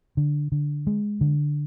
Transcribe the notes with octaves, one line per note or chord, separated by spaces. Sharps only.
D3
D3
G#3
D3